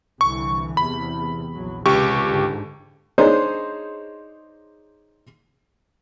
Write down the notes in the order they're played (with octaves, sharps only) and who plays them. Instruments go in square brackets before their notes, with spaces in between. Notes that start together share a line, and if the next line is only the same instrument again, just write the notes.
[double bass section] C2 D3 E3 [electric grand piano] C#6
[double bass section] E2 C3 [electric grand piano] B5
[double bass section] A#1 E2 F#3
[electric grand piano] C#2 G4 C#6 [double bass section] C3
[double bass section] G#2 D3
[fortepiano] D4 D#4 G#4 C5 C#5